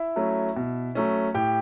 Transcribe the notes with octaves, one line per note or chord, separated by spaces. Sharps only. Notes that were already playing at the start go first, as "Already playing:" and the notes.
Already playing: E4 E5
F#3 A3 C#4
B2
F#3 A3 C#4
A2 G4 G5